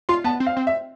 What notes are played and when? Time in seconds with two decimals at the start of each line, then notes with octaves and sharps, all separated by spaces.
0.09 F4 C6
0.24 B3 A5
0.40 C4
0.46 F5
0.57 C4
0.67 E5